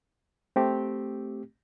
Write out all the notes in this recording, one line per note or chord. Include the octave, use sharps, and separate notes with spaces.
A3 C4 G4